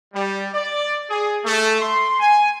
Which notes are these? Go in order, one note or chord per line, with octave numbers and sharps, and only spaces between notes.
G3
D5
G#4
A3
C6
G#5